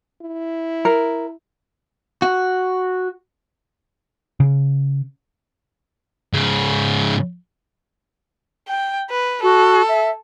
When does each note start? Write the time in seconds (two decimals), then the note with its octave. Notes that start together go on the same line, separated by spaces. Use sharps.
0.22 E4
0.85 A#4
2.22 F#4
4.40 C#3
6.33 G#2 C#3
8.68 G5
9.10 B4
9.43 F#4 A4
9.88 E5